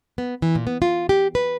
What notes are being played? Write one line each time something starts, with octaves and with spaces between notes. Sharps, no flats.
B3
E3
A#2
B3
F4
G4
B4